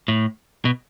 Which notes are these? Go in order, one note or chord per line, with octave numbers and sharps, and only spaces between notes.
A2
B2